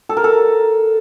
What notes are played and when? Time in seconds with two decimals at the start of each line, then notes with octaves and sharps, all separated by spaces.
0.09 A4
0.17 A#4
0.24 A4